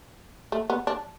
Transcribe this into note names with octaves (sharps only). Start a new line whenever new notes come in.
A3
B3
D4